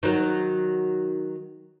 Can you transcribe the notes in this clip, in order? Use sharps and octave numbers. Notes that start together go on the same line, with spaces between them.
D#3 F#3